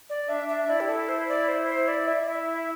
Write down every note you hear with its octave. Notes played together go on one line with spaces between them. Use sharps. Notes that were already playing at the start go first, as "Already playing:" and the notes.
D5
D4 E5
E5
E4 D5
G4
A4
C5
D5
C5
C5
D5
E5
D5
E4 E5